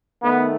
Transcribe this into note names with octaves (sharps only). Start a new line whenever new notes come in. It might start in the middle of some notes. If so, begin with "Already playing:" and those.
D#3 A3 B3